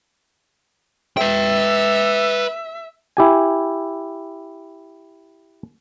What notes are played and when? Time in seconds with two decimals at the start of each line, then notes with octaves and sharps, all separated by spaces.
1.17 B4 E5 G5
3.17 E4 G4 G#5